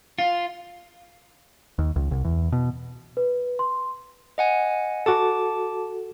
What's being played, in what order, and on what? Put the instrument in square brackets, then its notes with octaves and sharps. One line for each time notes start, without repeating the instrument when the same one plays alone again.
[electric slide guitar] F4
[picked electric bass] D#2
C#2
C2
E2
B2
[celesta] B4
C6
[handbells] D#5 F#5 G#5
[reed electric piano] F#4 A4 [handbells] A5 D6